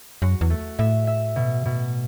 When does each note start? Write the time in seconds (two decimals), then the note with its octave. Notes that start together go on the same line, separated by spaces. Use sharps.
0.22 F#2 F#4
0.41 E2
0.50 A3
0.79 A2 E5
1.07 E5
1.36 B2
1.65 B2